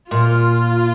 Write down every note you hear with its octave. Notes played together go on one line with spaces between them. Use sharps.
A#2 F4